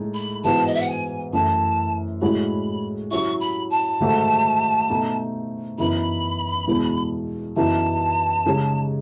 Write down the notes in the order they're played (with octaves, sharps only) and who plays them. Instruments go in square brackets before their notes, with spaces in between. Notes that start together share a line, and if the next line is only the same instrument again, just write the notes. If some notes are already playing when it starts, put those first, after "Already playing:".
Already playing: [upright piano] A2 G#3 D#4
[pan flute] B5
[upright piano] G#2 E3 B3 F#4 [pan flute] A5
[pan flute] D#5
E5
F#5
G#5
[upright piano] F#2 E3 A3 E4 [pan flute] A5
[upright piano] A2 G#3 C#4 F#4 C#5 [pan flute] B5
[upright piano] F#3 C#4 E4 [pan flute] C#6
[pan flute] B5
A5
[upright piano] G#2 D#3 F#3 A3
B2 A3 D#4
[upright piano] F#2 E3 B3 D#4 [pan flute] B5
[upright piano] E2 B2 G#3
[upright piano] F#2 E3 B3 D#4 F#4 [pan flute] A5
[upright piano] C#3 G#3 D#4 G#4 C#5